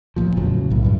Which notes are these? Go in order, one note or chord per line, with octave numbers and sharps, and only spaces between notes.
A1 F#2 A#2 F3
E2 A2 C#3 F#3
B1 A2
C#2 G2